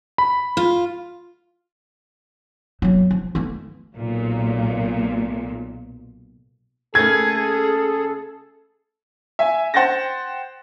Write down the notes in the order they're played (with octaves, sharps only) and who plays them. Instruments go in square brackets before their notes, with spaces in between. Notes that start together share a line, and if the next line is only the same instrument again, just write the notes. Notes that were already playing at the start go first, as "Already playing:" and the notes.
[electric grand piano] B5
[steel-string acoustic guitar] F4
[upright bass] F#3 A#3
F3
E3 A3
[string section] B1 A#2
[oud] C#3 A3 A#3 [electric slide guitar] G#4 [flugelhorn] A4 [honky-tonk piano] G#6
[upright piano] E5 G#5
C5 F#5 G5 A6 A#6